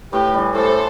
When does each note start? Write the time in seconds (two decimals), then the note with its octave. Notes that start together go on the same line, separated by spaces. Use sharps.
0.12 A2 G4 B4
0.34 E3 G3
0.55 A2 A4 C5